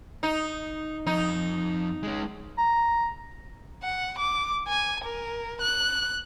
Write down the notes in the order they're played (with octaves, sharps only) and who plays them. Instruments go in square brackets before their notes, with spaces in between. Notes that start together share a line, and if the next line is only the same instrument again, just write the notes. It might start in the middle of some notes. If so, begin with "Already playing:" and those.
[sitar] D#4
[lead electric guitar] F2 [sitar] D#4
[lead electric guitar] G#3 C#4
[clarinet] A#5
[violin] F#5
D6
G#5
A#4
F#6